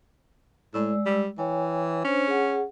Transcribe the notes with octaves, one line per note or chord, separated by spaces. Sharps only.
A2 G#3 D5 E6
G3
E3 C#5 G5 G#5
C#4 D4 C5
G#4 F#5